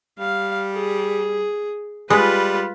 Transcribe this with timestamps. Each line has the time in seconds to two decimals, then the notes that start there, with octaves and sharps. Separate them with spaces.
0.19 G3 F5
0.74 G#4
2.10 G3 G#3 F4 B4